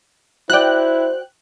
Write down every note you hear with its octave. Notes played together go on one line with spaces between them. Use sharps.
E4 F#4 C5 D5 G5 F#6